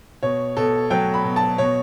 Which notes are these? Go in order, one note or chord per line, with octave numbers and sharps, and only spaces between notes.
B2 C#5
B2 A4
F#3 G5
B5
B2
A5
B2 C#5